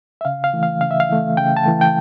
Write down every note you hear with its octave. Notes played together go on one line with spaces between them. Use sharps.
E5
C#3 F5
F5
E3 A3
F5
C#3 F5
E5
F5
E3 A3
C#3 G5
A5
E3 A3
G5